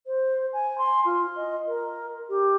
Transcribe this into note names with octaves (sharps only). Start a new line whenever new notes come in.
C5
G#5
C6
F4
D#5
A#4
G4